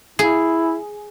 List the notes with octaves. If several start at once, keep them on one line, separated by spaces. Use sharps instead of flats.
E4 G#4